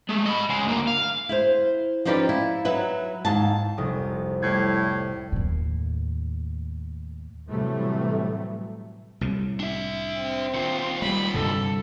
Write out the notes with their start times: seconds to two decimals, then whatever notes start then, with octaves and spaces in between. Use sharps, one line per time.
0.09 G#3 A3
0.26 D#5 B5
0.50 G#3 C#4
0.64 D2 A#3
0.87 F5
1.29 E4 G#4 C5
2.05 F3 C#4 D#4 G4 B4 D5
2.29 E4
2.65 F#3 D#4 B4 E5
3.25 D#2 G#2 A5
3.77 F1 C2 D#6
4.43 A2 G3 G#6
5.32 D#2 A2
7.50 A2 C3 E3 F#3 G3 A3
9.21 C2 A2
9.60 D4 E5
10.19 C4
10.54 D#3 F4
11.02 G3 G#3 B5
11.34 C2 G2 D3 A4